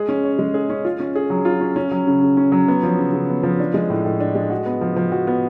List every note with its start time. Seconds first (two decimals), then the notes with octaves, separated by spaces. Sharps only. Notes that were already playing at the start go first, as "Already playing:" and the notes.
Already playing: G#3 G#4
0.09 C#4
0.24 C#5
0.39 G#3
0.54 G#4
0.70 C#4
0.85 F4
1.00 C#4
1.15 G#4
1.30 F#3
1.45 F4
1.61 C#4
1.76 C#4
1.91 F#3
2.07 C#3
2.22 C#3
2.37 C#4
2.52 F#3
2.68 B3
2.83 F3
2.99 C#3
3.13 C#3
3.29 B3
3.43 F3
3.59 D4
3.74 G#3
3.90 A2
4.05 A2
4.20 D4
4.35 G#3
4.50 F#4
4.66 B3
4.81 F3
4.96 F3
5.12 F#4
5.27 B3